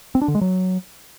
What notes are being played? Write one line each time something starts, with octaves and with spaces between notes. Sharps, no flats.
C4
D4
D3
G#3
F#3